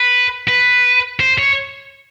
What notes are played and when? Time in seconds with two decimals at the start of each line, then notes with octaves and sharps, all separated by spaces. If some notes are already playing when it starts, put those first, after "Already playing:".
Already playing: B4
0.48 B4
1.20 C5
1.39 C#5